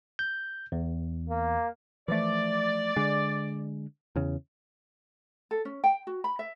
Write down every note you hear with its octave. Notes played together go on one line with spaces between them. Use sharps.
G6
E2
A#3
E3 F3 A3 D5
D3 G#3
E2 C#3
A4
C#4
G5
F#4
B5
E5